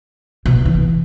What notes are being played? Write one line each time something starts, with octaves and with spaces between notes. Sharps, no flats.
B2
E3